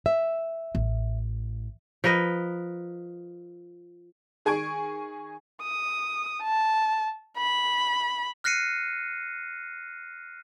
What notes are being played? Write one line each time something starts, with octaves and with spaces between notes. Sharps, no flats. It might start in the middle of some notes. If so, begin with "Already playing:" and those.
E5
A1
F3 A#4 B4 D#5
D#3 G#4 G#5 C#6 G#6 D7
D#6
A5
B5
F6 F#6 A#6 C7 C#7 D#7